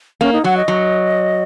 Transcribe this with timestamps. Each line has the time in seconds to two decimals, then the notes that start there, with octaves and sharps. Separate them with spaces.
0.21 A#3 C#4
0.33 D#4
0.44 F#3 F#5
0.57 D#5
0.68 F#3